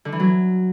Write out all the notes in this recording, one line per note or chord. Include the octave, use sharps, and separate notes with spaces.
D3
E3
F#3